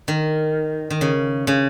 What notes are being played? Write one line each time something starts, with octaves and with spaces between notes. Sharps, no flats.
D#3
D#3
C#3
C#3